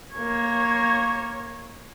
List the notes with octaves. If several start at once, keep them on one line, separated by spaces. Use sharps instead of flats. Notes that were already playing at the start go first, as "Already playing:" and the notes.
A#3 C#5